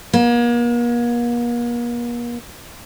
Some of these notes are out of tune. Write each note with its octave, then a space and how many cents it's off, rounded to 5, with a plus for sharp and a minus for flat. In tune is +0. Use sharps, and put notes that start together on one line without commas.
A#3 +40